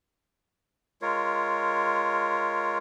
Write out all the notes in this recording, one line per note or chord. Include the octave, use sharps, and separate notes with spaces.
G#3 F4 A#4 C#5